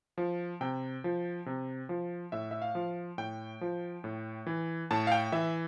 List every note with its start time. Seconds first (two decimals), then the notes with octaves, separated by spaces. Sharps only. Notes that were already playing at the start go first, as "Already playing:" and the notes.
0.18 F3
0.61 C3 G5
1.04 F3
1.46 C3
1.89 F3
2.32 A2 E5
2.51 E5
2.62 F5
2.75 F3
3.18 A2 G5
3.61 F3
4.04 A2
4.47 E3
4.91 A2 A5
5.07 F5
5.12 G5
5.32 E3 E5